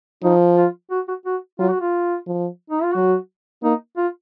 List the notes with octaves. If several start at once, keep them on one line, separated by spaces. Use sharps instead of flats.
F3 D#4
F4
F#4
F#4
F#4
F#3 F4
F#4
F4
F3
D#4
F4
F#3 F#4
A#3 D#4
F4